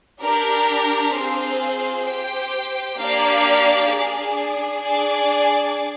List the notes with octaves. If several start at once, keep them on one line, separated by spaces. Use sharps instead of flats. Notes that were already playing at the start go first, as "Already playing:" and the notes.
D4 G4 A#4
C4 F4 G#4 C5
G4 C5 G5
A#3 D4 G4 D5 F5
D4 G#4 D5
D4 G#4 D5 G#5